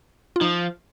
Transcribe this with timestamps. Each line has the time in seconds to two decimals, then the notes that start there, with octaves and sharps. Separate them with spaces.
0.36 F4
0.41 F3 D#4